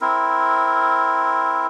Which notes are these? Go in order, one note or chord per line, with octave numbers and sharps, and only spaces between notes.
C4 E4 A#4